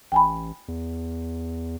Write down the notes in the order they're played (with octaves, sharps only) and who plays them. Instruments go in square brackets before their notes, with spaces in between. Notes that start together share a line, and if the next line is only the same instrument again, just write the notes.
[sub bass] A1 [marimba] G5 G#5 B5
[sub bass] E2